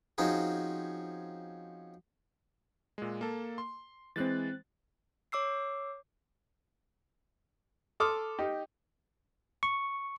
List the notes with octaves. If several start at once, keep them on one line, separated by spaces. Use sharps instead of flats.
F3 C4 C#4 D#4 F#4 G#4
A#2 G#3
A#3 A4
C6
E3 G#3 C4 F#6 A6
C#5 D6 E6 C7
A4 C6 D6 D#6 F6
D#4 G4
C#6